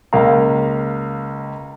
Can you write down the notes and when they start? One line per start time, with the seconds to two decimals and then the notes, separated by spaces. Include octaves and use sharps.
0.13 C#2 A#3 F5 A#5